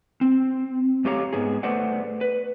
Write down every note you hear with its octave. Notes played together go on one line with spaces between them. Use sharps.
C4
F#2 A3 G4 C#5 F5 A#5
G#2 B3 G#4
A3 A4 B4 C5 D5 F#5
B4